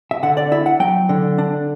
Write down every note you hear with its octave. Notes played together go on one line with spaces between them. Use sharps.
E5
D3 F#5
D5
E4 E5
F#5
F#3 G5
D3
D4